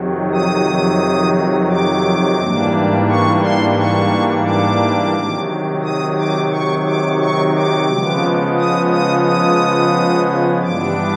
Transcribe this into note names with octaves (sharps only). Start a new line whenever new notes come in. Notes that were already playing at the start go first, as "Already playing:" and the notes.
Already playing: F2 C3 D#3 F#3
D#6
D6
G#2 E3 G3 A#3 D4
C#6
C6
C#6
D6
C3 D#3 F#3
D#6
D6
C#6
D6
C#6
D6
C#3 F3 G#3 B3
D#6
D#6
D#6
G2 E3 G3 B3 D4 D6